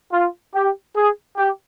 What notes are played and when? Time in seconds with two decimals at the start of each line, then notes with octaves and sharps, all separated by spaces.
0.12 F4
0.54 G4
0.95 G#4
1.36 G4